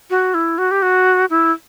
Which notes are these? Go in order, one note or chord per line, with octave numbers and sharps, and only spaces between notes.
F#4
E4
F#4
G4
F#4
E4